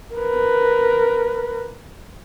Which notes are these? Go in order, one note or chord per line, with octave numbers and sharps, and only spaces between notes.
A#4 B4